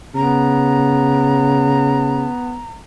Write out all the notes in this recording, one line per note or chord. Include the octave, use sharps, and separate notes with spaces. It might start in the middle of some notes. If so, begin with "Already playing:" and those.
C#3 B3 A#5